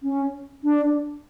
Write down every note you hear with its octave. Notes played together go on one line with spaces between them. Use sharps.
C#4
D4